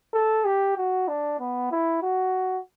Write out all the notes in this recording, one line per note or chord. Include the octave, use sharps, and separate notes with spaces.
A4
G4
F#4
D4
B3
E4
F#4